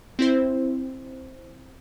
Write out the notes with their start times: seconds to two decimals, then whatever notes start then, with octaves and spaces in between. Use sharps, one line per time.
0.19 C4 E4 C5